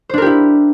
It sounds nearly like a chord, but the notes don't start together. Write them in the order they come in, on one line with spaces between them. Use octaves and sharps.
C5 D4 A#4 G4 E4